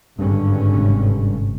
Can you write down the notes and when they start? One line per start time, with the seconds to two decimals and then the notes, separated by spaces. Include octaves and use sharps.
0.19 G#1 G2 D3 C#4
0.74 G1 G#2 C3